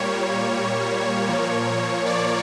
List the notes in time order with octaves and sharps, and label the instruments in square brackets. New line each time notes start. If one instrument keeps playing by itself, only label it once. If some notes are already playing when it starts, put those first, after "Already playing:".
Already playing: [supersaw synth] A#2 G3 A#3 C#5
A#2 F3 A#3
D5